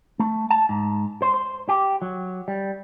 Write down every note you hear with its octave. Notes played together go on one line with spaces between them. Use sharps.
A3
A5
G#2
C5
C5
G4
F#3
G3